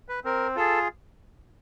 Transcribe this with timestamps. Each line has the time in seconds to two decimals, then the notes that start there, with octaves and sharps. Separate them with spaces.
0.09 B4
0.24 C4 A#4
0.56 F4 G#4 A4